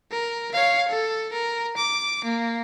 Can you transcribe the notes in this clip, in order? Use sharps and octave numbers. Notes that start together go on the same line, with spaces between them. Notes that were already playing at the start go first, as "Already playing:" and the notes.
A#4
C#5 F5
A4
A#4
D6
A#3